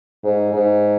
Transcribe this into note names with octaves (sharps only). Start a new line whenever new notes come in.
G#2
G#2